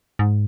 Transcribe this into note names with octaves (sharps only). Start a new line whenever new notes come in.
G#2